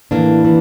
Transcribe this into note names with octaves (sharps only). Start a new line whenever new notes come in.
A2 E3 A#3 D4
E3